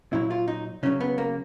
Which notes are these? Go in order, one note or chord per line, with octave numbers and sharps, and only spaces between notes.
A#2 F#3 E4
F4
D#4
C#3 F#3 C#4
B3
A#3